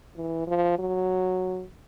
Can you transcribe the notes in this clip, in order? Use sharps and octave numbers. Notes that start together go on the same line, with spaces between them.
E3
F3
F#3